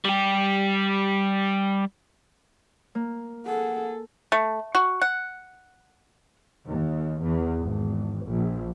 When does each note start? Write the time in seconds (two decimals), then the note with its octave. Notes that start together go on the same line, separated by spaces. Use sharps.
0.05 G3 G4
2.95 A#3
3.46 G#4 A4 F#5
4.32 A3
4.75 F#4
5.01 F#5
6.68 D#2
7.23 E2
7.61 G#1
8.27 A#1